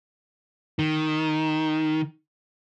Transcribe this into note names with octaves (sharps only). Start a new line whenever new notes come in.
D#3